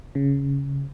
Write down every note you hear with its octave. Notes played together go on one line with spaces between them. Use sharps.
C#3